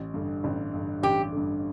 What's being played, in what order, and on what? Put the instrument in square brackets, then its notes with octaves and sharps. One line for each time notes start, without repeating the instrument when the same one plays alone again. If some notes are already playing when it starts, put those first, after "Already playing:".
Already playing: [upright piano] A1
G2 D3
A1
G2 D3
[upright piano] A1 [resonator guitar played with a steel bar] G4
[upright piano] G2 D3